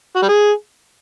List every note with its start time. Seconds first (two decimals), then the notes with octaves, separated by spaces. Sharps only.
0.16 F#4
0.22 G3
0.29 G#4